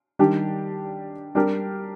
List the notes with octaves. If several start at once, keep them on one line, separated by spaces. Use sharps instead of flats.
D#3 G3 D4 G4
G3 D4 G4 A#4